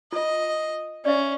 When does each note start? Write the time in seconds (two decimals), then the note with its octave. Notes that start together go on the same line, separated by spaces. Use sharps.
0.13 F4 D#5
1.05 C#4 D5 E5